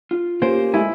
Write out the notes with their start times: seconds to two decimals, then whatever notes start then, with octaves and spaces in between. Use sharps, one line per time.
0.11 F4
0.42 A#3 C#4 G4 C5
0.74 G#3 A3 E4 G#5